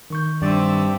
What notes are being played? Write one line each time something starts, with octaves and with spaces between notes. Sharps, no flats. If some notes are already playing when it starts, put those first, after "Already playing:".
D#3 C#6 G6
G2 C4 D5 E5